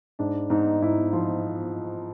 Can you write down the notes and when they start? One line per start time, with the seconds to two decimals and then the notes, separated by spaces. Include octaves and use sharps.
0.19 G#2 D4
0.50 G#2 D#4
0.82 G#2 E4
1.13 F3 F4